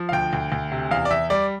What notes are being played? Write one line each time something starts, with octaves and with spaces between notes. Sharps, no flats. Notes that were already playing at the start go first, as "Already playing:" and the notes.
Already playing: F3
F5
D2 G5
D2
D2
C3
E2 F5
D5
E2 E5
G3 D5